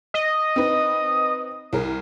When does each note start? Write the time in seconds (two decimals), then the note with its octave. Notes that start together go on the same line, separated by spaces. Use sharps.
0.14 D#5
0.56 C4 D#4 B4
1.73 C2 A#4